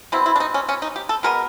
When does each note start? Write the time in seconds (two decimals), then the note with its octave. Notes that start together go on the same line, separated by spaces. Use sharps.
0.12 B2 G3 C4 E4
0.26 E4
0.36 D4
0.40 D#4
0.54 C#4
0.69 C#4
0.82 D#4
0.96 G4
1.09 A4
1.23 B2 G#3 B3 A#4